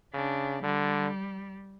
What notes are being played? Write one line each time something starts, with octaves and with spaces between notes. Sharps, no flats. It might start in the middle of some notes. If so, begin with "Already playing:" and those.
C#3 D4
D3 G3